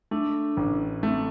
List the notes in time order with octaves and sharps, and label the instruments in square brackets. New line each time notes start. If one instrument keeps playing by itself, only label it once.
[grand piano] A3 [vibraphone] D4
[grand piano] A1
[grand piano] A3 [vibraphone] C4